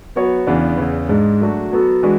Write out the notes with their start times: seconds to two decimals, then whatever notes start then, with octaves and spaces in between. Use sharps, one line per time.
0.16 F#3 B3 F#4 C#5
0.47 E2 C#3 E3 B3 D4
0.77 E2 C#3 E3
1.09 G#2 G#3 D4
1.41 F#3 A3 D4 F#4
1.72 F#3 B3 F#4 A4
2.03 E3 G#3 D4 F#4 B4